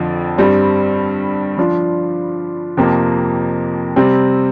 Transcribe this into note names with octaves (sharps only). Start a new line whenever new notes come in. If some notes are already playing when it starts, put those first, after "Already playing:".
Already playing: F2 D3 F3
G2 G3 C4
F3 D4 F4
F2 C3 F3 A#3 G4
C3 G3 C4